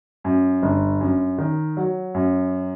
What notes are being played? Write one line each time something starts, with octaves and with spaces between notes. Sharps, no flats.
F#2
G1
F#2
D#3
F#3
F#2